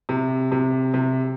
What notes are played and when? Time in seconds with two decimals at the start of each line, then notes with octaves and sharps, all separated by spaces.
0.09 C3
0.52 C3
0.94 C3